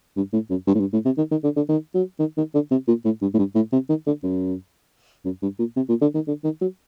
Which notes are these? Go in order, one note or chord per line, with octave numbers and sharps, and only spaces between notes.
G2
A2
F#2
G2
A2
G2
A2
C3
D#3
D#3
D3
D3
D#3
F#3
D#3
D#3
D3
C3
A#2
A2
G2
A2
G2
A2
C3
D#3
D3
F#2
F#2
G2
A#2
C3
A#2
D3
D#3
D3
D#3
F#3